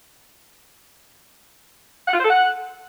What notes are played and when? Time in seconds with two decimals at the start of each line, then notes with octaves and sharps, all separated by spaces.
2.08 F#5
2.13 F4
2.19 C5
2.24 A4
2.30 F#5